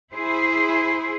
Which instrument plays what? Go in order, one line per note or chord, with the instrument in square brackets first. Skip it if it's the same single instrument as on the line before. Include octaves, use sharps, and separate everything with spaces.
[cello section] E4 G#4 C5